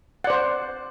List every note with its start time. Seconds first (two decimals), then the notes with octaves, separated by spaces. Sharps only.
0.24 F#5
0.27 D5
0.30 C5